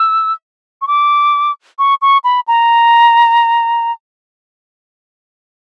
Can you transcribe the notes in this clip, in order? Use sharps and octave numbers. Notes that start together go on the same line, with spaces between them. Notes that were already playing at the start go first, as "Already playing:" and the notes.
Already playing: E6
C#6
D6
C#6
C#6
B5
A#5